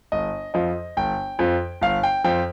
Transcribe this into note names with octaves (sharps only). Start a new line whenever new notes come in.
G1 D#5
F2 F3 D#5
G1 G5
F2 F3
G1 F5
G5
F2 F3 G5